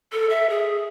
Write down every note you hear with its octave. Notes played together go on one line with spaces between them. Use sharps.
A4
E5
G#4